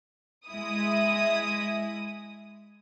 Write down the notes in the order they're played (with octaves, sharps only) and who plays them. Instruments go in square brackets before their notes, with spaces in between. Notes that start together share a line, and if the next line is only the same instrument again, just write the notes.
[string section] G#3 E4 D#6